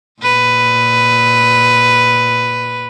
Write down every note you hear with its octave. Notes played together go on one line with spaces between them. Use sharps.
A#2 B4